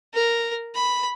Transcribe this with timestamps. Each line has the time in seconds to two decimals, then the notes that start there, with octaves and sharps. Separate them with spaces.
0.14 A#4
0.74 B5